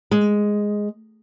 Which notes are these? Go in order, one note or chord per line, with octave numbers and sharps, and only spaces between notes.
G#3